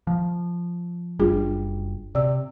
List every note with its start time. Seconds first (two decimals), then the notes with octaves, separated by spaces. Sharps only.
0.07 F3
1.19 F#1 G3 D4 F4 G#4
2.15 C3 D5 E6